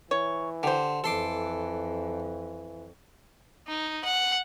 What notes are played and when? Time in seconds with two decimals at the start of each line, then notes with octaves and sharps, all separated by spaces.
0.11 E3 C#5
0.63 D3 G4 C5
1.04 F2 E3 A4 C6 D6
3.68 D#4
4.05 F#5